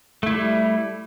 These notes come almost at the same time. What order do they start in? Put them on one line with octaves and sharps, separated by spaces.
A3 E4 G3